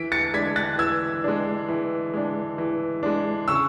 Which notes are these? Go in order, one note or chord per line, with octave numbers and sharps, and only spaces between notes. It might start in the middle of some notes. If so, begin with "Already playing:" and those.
Already playing: E3 B6 D7
A6 C#7
G#3 D4 G#6 B6
F#6 A6
E3 E6 G#6
G#3 D4
E3
G#3 D4
E3
G#3 D4
C#3 C#6 E6